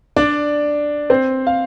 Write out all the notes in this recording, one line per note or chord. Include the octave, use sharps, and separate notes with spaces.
D4 D5
C4 C5
F5